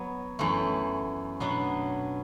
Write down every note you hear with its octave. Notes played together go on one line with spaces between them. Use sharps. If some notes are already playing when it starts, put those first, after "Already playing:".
Already playing: F#3 B3
F#2 E3 A3
B2 F#3 B3 D4